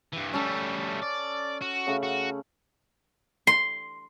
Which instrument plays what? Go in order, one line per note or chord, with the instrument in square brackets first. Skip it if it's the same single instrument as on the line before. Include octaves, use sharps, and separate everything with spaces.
[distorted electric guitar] G2 E3
[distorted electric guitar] G3 A3 [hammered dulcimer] C#4 A4
[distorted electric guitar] D5
F#4
[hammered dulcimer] C#3 A3
[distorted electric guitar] F#4
[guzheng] C6